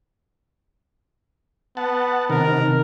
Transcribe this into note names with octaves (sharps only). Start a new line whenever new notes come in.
B3 F#5 A5
C3 D#3 A#4